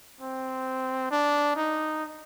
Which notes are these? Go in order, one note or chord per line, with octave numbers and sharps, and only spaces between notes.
C4
D4
D#4